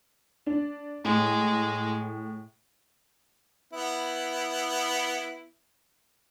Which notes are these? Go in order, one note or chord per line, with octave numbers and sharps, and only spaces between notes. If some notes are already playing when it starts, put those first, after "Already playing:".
D4
A2 G#3
B3 E4